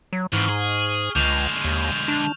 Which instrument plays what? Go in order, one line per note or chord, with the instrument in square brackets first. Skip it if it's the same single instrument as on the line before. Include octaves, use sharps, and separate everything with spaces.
[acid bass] F#3
[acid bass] G#2 [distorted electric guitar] E3 C4 [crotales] C#6 F6
[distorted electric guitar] G#4
[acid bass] C#2 [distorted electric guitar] D3 G#3 [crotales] G6 E7 F7
[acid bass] D#2
D4